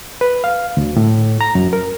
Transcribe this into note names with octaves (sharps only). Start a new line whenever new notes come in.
B4
F5
D2
A2
A#5
F#2
A#4